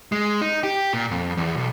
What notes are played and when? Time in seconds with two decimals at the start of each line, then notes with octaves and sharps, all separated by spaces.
0.12 G#3
0.42 D#4
0.63 G4
0.94 A#2
1.11 F2
1.37 E2
1.57 B1